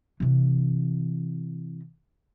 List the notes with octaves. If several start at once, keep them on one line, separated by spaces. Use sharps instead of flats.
C3 E3